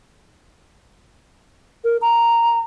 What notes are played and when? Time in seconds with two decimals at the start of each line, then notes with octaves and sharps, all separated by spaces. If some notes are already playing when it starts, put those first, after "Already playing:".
1.84 A#4
2.02 A#5